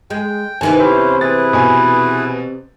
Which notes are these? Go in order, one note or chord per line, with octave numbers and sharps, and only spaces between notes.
G#3 G5
C3 D#3 E3 B3 G#5
C#4 E4 G4 C5
E4 G#4 B4 A6
B2 G#5